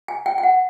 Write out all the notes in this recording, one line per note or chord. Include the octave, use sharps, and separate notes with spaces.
G#5
G5
G5
F#5